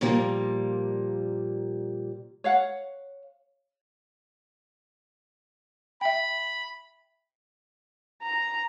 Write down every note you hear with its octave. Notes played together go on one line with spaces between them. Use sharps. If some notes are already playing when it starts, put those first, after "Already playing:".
A#2 F3 G3 A#3
C#5 F5 F#5
E5 G5 B5
A#5